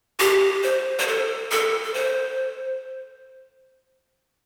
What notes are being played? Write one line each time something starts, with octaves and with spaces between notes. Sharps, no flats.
G4
C5
C5
A4
A4
A4
C5